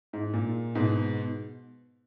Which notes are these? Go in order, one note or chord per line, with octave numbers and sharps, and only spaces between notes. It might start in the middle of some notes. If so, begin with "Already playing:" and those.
G#2
A#2
G#2 B2